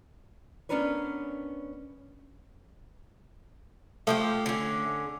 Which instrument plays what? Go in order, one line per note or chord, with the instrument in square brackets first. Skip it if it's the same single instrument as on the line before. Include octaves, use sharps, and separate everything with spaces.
[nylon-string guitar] B3 C#4 D4 A#4 B4 C#5
[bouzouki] F3 F#4 G4 [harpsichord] A3
[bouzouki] D3 C#4